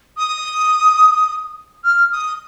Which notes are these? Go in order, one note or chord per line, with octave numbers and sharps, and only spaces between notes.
D#6
F6
D#6